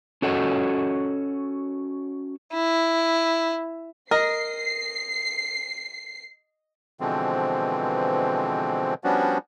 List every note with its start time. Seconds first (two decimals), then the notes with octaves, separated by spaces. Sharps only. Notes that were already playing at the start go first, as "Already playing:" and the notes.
0.22 C#4 F#4 A4 C#5 D#5 F#5
2.54 E4
4.11 A#4 D#5 C7
7.00 B2 D3 E3 F3 G#3 C4
9.04 F3 G3 B3 C#4 D4 F#4